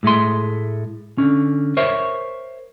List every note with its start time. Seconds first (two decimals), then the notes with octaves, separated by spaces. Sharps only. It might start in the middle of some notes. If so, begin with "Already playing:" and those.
0.03 A2 G#3 A3 C6
1.18 D3 C#4
1.77 A#4 C5 C#5 E5